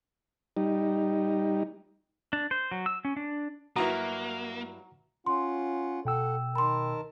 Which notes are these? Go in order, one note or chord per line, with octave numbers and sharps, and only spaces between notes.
G3 D#4
D4
C5
F#3
E6
C#4
D4
G2 F#3 A#3 E4 F#4 B4 F#5 A#5
C#4 F4 F#5 C6
B2 A4 F#5 G5 E6
D#3 A#4 A5 B5 C6